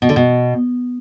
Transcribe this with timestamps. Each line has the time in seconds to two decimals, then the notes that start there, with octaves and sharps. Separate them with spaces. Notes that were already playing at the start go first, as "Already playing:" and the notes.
0.02 B2
0.09 D3
0.16 B2